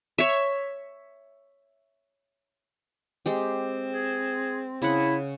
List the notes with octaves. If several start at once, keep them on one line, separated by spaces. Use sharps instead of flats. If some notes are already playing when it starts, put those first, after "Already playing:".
C#5 E5
G#3 C4 G4
G#4
C#3 E4 F#5